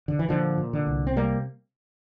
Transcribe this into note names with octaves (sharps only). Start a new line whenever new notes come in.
D3
E3
A#2 D3 F3
A#2
D3
C2
C4
C3 G3 A#3